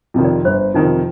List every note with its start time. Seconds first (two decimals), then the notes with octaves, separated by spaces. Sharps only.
0.14 F2 C3 D#3
0.25 D5
0.45 G1 C5
0.74 F2 C3 D#3 D#4